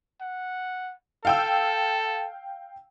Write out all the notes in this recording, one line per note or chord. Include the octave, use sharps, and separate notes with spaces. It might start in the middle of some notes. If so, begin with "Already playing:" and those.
F#5
A4 F5 G5 E6